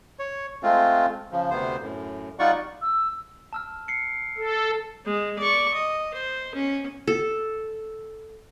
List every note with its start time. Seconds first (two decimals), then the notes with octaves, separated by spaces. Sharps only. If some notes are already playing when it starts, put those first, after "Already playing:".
0.19 C#5
0.63 G#3 A3 C4 F4
1.32 C#3 F3
1.50 D2 C3 B3 C5
1.82 F#2 A2
2.39 G3 D#4 F4 D5 F#5 C#6
2.82 E6
3.53 A5 E6 F6
3.88 C7 C#7
4.38 A4
5.05 G#3
5.38 D5 C#6
5.74 D#5
6.14 C5
6.55 C#4
7.07 A4